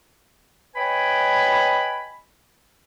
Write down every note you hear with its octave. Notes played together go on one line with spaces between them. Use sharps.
B4 C#5 D#5 G5 G#5 B5